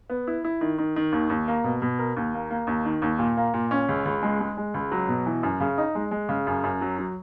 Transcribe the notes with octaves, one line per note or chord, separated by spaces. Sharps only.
B3
E4
E4
D#3
D#3
D#3
D#2
D#2
A#3
B2
B2
A#4
D#2
A#3
A#3
D#2
D#3
D#2
A#2
A#3
A#2
C#4
C#2
C#2
G#3
G#3
G#3
C#2
F#3
B2
E3
F#2
C#3
D#4
G#3
G#3
C#3
F#2
F#2
F#3
F#3